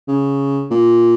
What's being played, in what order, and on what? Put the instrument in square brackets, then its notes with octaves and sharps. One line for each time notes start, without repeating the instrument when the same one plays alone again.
[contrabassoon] C#3
A#2